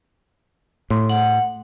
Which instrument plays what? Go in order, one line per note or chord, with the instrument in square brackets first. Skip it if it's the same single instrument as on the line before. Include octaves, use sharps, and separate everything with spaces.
[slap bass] A2 [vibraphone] C6
[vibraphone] F#5